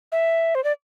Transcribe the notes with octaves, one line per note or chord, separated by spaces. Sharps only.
E5
C5
D5